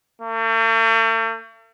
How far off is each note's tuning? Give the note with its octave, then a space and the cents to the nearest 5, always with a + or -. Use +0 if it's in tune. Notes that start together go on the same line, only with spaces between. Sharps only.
A3 +45